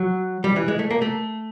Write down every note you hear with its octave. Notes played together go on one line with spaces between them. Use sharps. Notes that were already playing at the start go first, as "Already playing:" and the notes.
Already playing: F#3
G3
E3
G#3
A3
A#3
A3